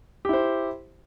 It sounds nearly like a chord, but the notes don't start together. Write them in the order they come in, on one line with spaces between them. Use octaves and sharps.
G4 E4 C5